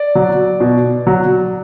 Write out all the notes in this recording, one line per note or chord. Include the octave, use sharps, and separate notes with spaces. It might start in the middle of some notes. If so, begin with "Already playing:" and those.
Already playing: D5
F#3
B2
F#3